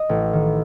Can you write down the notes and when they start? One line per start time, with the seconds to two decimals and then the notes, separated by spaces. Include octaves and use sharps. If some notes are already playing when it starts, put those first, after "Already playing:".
Already playing: D#5
0.09 A1
0.33 D#3